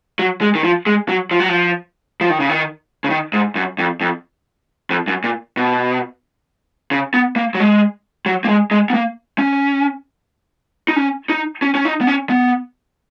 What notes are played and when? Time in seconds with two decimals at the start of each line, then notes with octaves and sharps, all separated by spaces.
0.19 F#3
0.41 G#3
0.55 D#3
0.64 F3
0.87 G#3
1.09 F#3
1.31 F3
1.40 F#3
1.49 F3
2.21 F3
2.30 D#3
2.40 C#3
2.50 D#3
3.04 C#3
3.10 D#3
3.33 G#2
3.55 F#2
3.78 F2
4.01 F2
4.90 F2
5.08 F#2
5.24 A#2
5.57 B2
6.91 C#3
7.14 B3
7.36 A#3
7.55 F#3
7.60 G#3
8.26 F#3
8.45 A#3
8.49 G#3
8.71 G#3
8.90 B3
8.94 A#3
9.39 C#4
10.88 D#4
10.96 C#4
11.29 D#4
11.62 C#4
11.75 C#4
11.85 D#4
12.01 B3
12.07 C#4
12.30 B3